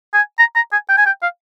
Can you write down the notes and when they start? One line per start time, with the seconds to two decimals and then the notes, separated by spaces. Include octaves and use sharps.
0.14 G#5
0.39 A#5
0.56 A#5
0.72 G#5
0.89 G5
0.98 G#5
1.06 G5
1.22 F5